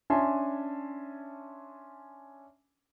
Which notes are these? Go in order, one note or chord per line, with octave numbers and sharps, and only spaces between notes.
C#4 D4 E5 G#5 A5 C6